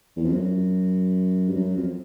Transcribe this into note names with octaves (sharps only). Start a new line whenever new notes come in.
E2
F2
F#2
G2
F#2
F2